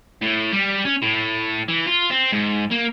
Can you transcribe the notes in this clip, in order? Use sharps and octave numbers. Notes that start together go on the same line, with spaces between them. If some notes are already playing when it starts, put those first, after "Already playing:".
A2
G3
C#4
A2
E3
F4
C4
G#2
A#3